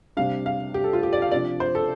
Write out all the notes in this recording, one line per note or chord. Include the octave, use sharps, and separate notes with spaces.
C3 G3 D4 F5
F5
G4
A4
F4
G4
D5
F5
C3 F3 D4 D5
C5
A4